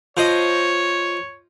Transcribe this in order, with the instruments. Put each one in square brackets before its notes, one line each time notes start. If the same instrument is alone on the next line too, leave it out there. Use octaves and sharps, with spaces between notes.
[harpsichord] F3 C5 D#5 [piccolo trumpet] C#5